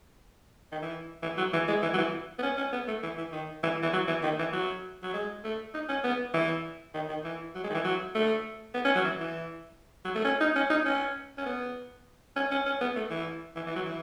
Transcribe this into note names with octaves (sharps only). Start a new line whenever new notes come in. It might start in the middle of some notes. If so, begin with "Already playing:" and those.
D#3
E3
E3
F#3
E3
G#3
E3
F#3
E3
B3
C#4
C#4
B3
A3
E3
E3
D#3
E3
E3
F#3
E3
D#3
E3
F#3
F#3
G#3
A3
D#4
C#4
B3
E3
D#3
D#3
E3
F#3
G#3
D#3
E3
F#3
A3
B3
C#4
F#3
E3
E3
F#3
A3
C#4
D#4
C#4
D#4
C#4
C#4
B3
C#4
C#4
C#4
B3
A3
E3
E3
E3
F#3
E3